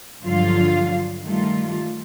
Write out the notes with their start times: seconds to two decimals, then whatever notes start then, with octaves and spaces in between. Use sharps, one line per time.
0.22 G2 D3 F3 F#3 F4 F5
1.23 D#3 G3 A3 F4